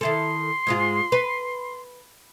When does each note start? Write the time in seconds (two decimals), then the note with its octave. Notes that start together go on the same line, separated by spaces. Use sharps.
0.01 D#3 E4 A4 C6
0.67 G#2 G#3 F4
1.12 B4